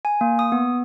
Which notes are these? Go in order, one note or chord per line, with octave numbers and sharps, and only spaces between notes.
G#5
A#3
D#6
B3